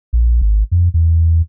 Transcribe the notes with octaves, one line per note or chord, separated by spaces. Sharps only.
A#1
G#1
F2
E2